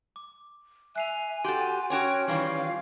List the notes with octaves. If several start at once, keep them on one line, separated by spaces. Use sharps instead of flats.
D6
E5 G#5 F#6 C7 F7
F#4 G4 A4 C6 G6
C#4 F#4 A#4 C#5 G5 G#5 D6 G#6
D#3 E3 G3 F5
F4